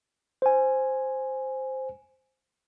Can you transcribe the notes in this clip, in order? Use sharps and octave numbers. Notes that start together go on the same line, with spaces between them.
C5 G#5